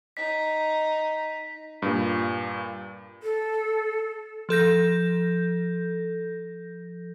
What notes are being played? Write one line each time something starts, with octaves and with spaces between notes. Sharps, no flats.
D#4 B6
G2 A#2
A4
F3 A4 G6 A#6